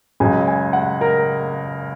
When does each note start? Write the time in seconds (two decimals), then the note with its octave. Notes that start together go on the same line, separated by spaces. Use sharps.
0.20 C#2 C#3 F#3 G#5
0.47 G#5
0.73 F#5
1.01 A#4